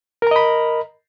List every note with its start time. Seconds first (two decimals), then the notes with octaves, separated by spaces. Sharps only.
0.22 A#4
0.27 A#5
0.31 D#5
0.36 B5